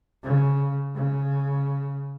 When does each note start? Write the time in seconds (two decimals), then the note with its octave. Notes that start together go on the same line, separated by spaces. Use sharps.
0.23 C#3
0.95 C#3